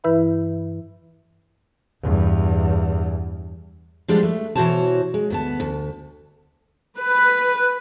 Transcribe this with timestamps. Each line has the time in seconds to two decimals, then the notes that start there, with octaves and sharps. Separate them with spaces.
0.04 G2 E3 E4 B4 E5 B5
2.02 E2 G2
4.08 F3 G3 G#3 B3 D4 G4
4.23 A3
4.55 B2 E3 F#4 C5 C#5 A5
5.14 G#3
5.30 D2 B3 A5
5.60 D2
6.98 B4